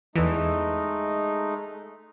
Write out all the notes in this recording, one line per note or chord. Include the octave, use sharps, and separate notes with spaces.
E2 E3 G#3 A3 D#4